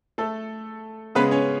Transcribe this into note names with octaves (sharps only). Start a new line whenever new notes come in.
A3 A4
C#3 G#3 B3 B4
C#4 C#5